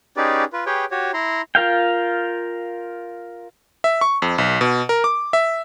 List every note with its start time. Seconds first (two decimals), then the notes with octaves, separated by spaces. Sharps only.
0.17 C#4 D#4 G4 G#4 B4 D5
0.53 F4 B4
0.66 G4 G#4 B4 C#5 G5
0.91 F#4 G4 C#5
1.14 E4 A#5 C6
1.55 F4 A#4 F5 G5
3.84 E5
4.01 C#6
4.22 F2
4.38 B1
4.61 B2
4.89 A#4
5.04 D6
5.33 E5